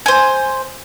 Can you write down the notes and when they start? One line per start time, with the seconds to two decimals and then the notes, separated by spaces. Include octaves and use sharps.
0.06 C5 G#5